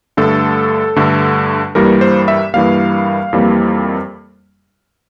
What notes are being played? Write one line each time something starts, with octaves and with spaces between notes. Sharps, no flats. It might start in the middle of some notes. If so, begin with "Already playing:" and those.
G2 D3 A3 A4
G2 D3 A3
G2 E3 G3 A#3 A#4
C5
E5
G2 E3 G3 A#3 F5
F2 E3 G3 A#3